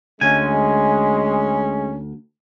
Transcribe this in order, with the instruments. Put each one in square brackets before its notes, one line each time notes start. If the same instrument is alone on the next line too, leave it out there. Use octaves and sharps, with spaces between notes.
[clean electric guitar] D2 G#5 [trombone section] G#3 [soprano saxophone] C#4